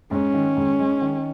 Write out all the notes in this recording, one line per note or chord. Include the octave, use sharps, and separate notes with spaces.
G#2 C#4
D#3
G#2
G#3
D#3